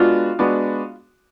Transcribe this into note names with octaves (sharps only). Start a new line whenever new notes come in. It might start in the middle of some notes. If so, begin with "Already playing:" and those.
Already playing: G#3 B3 D4 F4 F#4
G#3 B3 D4 F#4